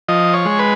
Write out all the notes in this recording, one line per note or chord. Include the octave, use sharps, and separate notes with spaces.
F3 D#5
C#5
G#3
B4